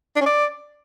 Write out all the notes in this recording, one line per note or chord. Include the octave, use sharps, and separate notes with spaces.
D4
C#4
D5